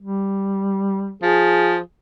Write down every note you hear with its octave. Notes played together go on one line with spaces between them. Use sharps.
G3
F3 G#4